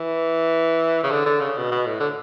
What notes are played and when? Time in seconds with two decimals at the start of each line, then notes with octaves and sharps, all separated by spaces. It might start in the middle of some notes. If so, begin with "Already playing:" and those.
Already playing: E3
1.03 C#3
1.11 D3
1.26 D3
1.41 C#3
1.57 B2
1.71 B2
1.87 A2
2.00 D3